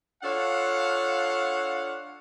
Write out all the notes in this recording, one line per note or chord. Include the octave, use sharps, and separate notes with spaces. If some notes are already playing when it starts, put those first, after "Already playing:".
D4 F4 A4 C#5 F5 F#5